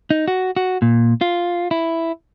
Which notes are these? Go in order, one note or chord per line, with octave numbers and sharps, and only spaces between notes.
D#4
F#4
F#4
A#2
F4
E4